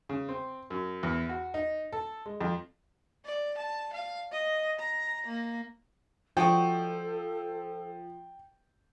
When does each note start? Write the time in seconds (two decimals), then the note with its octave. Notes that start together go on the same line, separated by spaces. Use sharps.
0.09 C#3
0.29 C4
0.70 F#2
1.03 E2
1.29 F#4
1.54 D#4
1.93 A4
2.26 G#3
2.41 F2
3.25 D5
3.58 A5
3.93 F5
4.31 D#5
4.79 A#5
5.27 A#3
6.37 F3 F#4 A4 D5 D#5 G5